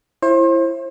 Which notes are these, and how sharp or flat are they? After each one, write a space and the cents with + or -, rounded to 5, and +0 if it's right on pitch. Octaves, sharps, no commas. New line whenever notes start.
E4 +20 C5 +35